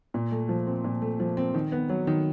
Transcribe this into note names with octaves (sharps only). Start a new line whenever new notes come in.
A#2
A3
F3
C4
A#2
A3
F3
C4
D#3
B3
F#3
D#3